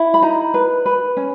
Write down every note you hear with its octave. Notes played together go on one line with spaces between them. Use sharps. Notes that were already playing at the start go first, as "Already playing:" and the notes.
Already playing: E4
B5
D#4 A#5
B4
B4
C#4